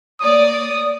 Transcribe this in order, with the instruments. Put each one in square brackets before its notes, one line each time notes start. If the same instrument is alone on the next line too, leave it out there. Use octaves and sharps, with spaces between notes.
[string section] A#3 C#5 D5 [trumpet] D#6